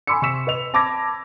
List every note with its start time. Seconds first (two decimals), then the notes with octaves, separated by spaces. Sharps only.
0.07 G#5 B5 C6 D6 E6 C#7
0.22 C3 C#6 E6 B6 E7
0.47 B4 D#5 F7
0.74 A5 B5 D6 E6 G#6 A#6